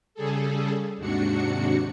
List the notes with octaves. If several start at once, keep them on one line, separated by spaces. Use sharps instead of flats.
C#3 G3 G#4 A4
D#2 G#2 C3 D4 F#4 C#7